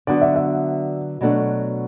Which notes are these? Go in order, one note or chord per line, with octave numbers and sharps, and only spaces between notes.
D3 F#3 B3 D4 F#4 D5
E5
E5
B2 F#3 A3 D4